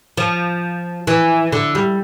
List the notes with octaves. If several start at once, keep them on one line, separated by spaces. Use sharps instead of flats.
F3
E3
D3
G3